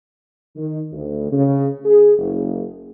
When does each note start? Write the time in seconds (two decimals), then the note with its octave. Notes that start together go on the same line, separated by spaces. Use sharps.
0.56 D#3
0.92 D2
1.31 C#3
1.85 G#4
2.18 F#1